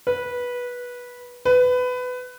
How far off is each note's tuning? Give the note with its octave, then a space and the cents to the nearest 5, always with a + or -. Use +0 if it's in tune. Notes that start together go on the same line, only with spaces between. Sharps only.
B4 -15
B4 +20